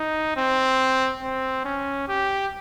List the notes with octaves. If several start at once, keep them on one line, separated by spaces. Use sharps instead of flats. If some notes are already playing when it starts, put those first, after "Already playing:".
Already playing: D#4
C4
C4
C#4
G4